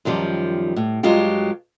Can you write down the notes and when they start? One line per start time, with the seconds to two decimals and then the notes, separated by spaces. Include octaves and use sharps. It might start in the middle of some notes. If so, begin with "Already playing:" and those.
0.05 F#2 D#3 F3 G3
0.76 A2
1.03 G2 F#3 G#3 F4 G4